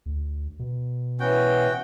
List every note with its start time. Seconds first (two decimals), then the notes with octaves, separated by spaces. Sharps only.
0.06 D2
0.59 B2
1.20 E3 B3 C#4 F#4 G5